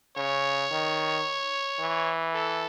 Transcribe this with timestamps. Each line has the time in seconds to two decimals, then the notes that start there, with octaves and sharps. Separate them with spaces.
0.16 C#3 C#5
0.71 D#3
1.80 E3
2.34 A4